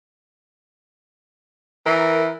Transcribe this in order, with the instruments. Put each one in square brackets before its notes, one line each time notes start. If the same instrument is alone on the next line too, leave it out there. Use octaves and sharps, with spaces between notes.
[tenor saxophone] E3 [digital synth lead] A#4